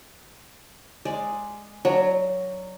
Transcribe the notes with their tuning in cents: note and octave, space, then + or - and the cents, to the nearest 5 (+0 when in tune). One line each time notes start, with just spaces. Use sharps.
G#3 +0 D5 +5
F#3 +0 D4 +20